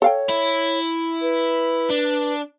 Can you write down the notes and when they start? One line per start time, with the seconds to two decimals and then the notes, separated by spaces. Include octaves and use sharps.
0.02 A4 C#5 F5 G5
0.30 E4
1.22 B4
1.89 D4